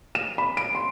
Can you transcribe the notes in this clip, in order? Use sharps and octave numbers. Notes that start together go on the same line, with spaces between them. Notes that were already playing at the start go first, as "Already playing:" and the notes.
E7
B5
D7
C6